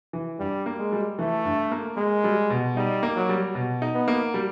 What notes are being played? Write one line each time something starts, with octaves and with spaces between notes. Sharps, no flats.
E3
G2 G3
A#3
G#3
G3
E3 A3
G2
A#3
G#3 A#3
G3
B2
G3 D#4
A#3
F#3
G3
B2
D#4
B3
A#3
G3